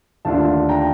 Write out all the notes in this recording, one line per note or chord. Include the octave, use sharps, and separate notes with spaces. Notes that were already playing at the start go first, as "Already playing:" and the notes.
D#2 D3 A3 D4 F4 F5 A5
G5 A#5